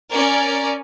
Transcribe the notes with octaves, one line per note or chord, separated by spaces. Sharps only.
C#4 A#4 D5